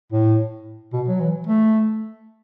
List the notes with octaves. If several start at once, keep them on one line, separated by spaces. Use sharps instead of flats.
A2
B2
F#3
E3
A3